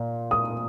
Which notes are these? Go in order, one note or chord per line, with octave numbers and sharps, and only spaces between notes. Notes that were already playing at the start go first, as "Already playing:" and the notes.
Already playing: A#2
D#6